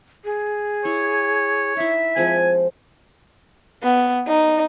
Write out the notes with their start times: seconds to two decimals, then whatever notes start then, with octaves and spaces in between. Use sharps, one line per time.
0.25 G#4
0.85 E4 C#5
1.77 D#4 E4 E5
2.16 F3 G#3 C4 G#5
3.83 B3
4.28 D#4